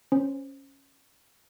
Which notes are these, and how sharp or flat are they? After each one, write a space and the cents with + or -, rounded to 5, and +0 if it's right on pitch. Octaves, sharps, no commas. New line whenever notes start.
C#4 -10 C5 +0